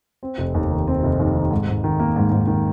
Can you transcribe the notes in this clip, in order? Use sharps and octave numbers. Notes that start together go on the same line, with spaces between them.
C4
F1
D#2
D#3
C4
F1
D#2
D#3
G#2
G#2
D#3
A#3
G#2
G#2
D#3